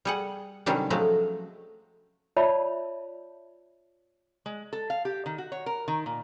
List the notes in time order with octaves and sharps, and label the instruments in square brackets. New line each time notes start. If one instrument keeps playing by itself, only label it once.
[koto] G3 G#4 F#5
C3 D#3 F#3 G3 C#4 D4
F3 F#3 G#3 A3 F#4
[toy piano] F4 C#5 D5 E5 A5 B5
[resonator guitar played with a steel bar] G#3
A4
F5
G4
D#3
F#4
C#5
A#4
D#3
A#2